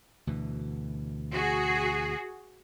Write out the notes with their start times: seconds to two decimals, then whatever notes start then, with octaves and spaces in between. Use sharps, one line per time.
0.27 D2 B2 E3
1.31 F#4 G#4